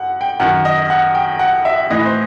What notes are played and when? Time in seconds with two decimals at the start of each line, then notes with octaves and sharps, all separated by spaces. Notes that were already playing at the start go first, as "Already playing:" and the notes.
Already playing: F#2 F#5
0.21 G5
0.40 F#2 D#3 F#5
0.65 D#5
0.90 F#5
1.15 G5
1.39 F#5
1.65 E5
1.91 A2 E3 D#5
2.05 C5